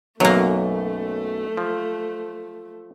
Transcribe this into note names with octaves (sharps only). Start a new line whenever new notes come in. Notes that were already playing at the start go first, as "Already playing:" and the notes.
B1 F#2 F#3 A3 A#3
F3